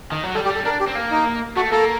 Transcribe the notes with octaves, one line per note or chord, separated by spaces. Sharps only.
D#3
F#3
G3 A4
G4
G3
A4
D4 A#4
G4
C4
A#3
D#4
A3 F#4
A#3 A4